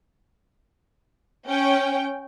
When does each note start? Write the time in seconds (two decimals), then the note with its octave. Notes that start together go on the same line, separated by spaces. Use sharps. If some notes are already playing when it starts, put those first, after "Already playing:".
1.48 C#4 G5